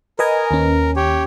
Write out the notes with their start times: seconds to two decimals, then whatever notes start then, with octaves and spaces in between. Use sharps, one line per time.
0.19 A#4 B4 D#5 G#5
0.51 D#2 C#4
0.96 G4 C#5